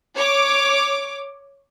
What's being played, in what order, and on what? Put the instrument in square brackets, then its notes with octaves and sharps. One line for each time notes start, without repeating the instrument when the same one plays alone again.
[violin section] C#5 D6